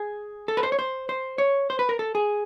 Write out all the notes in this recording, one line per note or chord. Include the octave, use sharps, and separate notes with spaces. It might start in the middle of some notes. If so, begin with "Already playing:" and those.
Already playing: G#4
A4
B4
C5
C#5
C5
C5
C#5
C5
B4
A#4
A4
G#4